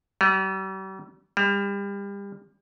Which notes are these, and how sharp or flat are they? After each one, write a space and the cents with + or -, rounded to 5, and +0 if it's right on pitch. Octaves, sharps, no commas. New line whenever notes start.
G3 -45
G3 +30